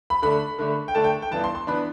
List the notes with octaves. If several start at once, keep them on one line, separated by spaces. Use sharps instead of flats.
B5
D3 A3 D4 B5
D3 A3 D4
G5
D3 A3 D4 A5
G5
G5
G2 E3 B3 D4 A5
C6
C6
E3 B3 D4 B5